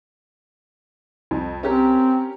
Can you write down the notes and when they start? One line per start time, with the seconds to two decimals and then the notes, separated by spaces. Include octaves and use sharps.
1.31 C2 F2
1.63 C4 C#4 G4 A#4